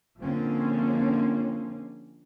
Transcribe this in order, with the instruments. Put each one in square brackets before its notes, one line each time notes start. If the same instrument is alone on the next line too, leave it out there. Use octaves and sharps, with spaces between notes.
[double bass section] D3 F3 G#3 A#3 C4 C#4